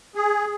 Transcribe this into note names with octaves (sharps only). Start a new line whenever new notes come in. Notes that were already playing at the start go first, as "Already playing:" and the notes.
G#4